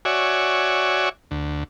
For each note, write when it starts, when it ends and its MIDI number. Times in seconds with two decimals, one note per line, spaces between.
0.05 1.09 66
0.05 1.09 73
0.05 1.09 74
0.05 1.09 76
0.05 1.09 80
1.31 1.64 38